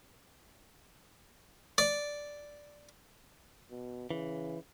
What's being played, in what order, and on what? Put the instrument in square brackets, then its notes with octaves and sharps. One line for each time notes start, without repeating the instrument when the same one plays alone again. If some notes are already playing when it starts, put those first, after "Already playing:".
[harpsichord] D5
[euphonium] B2
[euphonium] C#3 [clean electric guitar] E3